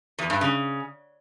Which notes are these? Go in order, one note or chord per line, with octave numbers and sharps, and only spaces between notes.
E2
G2
C#3